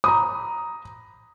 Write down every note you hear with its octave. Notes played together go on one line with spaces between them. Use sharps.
A#5 B5 D#6